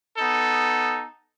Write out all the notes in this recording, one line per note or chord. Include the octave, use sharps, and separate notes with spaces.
B3 D#4 A4